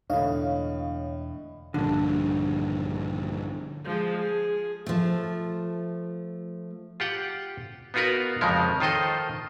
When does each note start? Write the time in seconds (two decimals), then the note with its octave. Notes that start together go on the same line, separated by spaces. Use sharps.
0.10 E1 A2 D3 C#5 D#5 F5
1.74 A#1 G2 D3
3.85 F3 G#3
4.18 G#4
4.86 F3 A3
7.00 F4 G4 F#5 G5
7.94 B3 D#4 F4 F#4 A#4 B4
8.41 F2 C#3 F3 G#3 C#4 A#4
8.80 D#3 F4 A4 C5 D#5